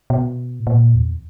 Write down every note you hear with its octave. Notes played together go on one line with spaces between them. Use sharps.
B2
A2
A#2
E2